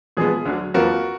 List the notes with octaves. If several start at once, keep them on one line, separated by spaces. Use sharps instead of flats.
A#2 F3 G#3 B3 G#4
D2 D3 F#3
F2 F3 A#3 F4 F#4 A#4 B4